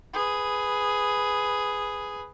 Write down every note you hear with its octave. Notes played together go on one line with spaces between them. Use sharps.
G#4 B4